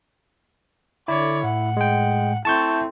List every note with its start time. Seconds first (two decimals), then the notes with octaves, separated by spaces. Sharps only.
1.08 D3 E4 C#5 D5
1.44 A2 F#5
1.77 G#3 G5
2.45 A3 C4 E4 A5 C#6 G6